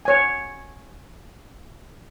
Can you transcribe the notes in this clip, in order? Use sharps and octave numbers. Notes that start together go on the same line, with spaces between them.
C#5 G#5